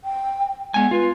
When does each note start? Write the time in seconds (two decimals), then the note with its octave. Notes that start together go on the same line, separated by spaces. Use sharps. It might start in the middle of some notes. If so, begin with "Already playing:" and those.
0.04 G5
0.74 G#3 B3 G#5
0.91 F4 B4